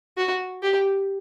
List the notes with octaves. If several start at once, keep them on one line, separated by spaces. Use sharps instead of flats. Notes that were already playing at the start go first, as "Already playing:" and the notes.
F#4
G4